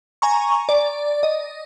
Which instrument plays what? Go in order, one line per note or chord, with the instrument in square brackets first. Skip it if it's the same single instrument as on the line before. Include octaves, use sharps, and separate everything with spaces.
[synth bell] G#5 A#5 C#6
D5
D#5